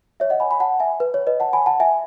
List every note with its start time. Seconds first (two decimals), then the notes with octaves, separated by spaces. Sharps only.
0.20 C#5 E5
0.30 D#5 F#5
0.40 G#5 B5
0.50 G#5 B5
0.60 F#5 A5
0.80 E5 G#5
1.00 B4
1.14 C#5
1.27 B4 D#5
1.40 F#5 A5
1.53 G#5 B5
1.66 F#5 A5
1.80 E5 G#5